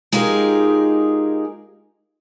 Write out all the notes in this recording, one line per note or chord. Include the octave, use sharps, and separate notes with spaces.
G#3 D#4 F4 G4 G#4 A#4